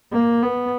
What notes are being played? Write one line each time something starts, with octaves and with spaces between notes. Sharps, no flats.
A#3
B3